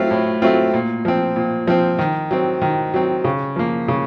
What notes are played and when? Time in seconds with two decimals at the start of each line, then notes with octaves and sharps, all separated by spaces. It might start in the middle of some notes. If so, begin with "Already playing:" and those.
Already playing: A2 F#3 A3 C4 F4
0.11 A2
0.42 F#3 A3 C4 F4
0.74 A#2
1.05 F3 C4
1.36 A#2
1.67 F3 C4
1.99 D#3
2.31 F#3 C4
2.62 D#3
2.94 F#3 C4
3.24 C#3
3.56 F3 A#3
3.88 C#3